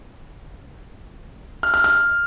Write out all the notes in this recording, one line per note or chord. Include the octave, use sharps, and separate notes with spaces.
F6
F6
F6